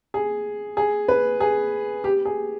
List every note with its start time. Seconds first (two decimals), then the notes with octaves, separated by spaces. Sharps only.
0.14 G#4
0.77 G#4
1.08 B4
1.40 G#4
2.04 G4
2.25 G#4